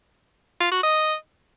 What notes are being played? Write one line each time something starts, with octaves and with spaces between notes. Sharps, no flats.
F4
F#4
D#5